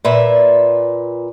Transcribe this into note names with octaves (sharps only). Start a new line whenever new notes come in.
A#2 B4 E5